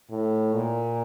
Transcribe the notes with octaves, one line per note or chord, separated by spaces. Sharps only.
A2
A#2